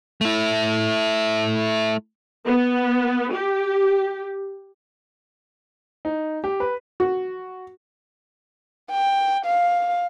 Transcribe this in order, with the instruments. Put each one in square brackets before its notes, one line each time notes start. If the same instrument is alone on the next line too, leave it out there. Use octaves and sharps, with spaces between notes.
[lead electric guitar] A3 E4
[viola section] B3
G4
[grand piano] D#4
G4
B4
[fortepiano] F#4
[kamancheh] G5
F5